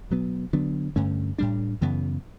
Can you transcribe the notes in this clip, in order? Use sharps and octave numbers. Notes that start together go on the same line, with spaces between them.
B2 F#3 B3
D3 F#3 B3 D4
G2 D3 A3 C#4
A2 G3 D4
F#2 C#3 E3 B3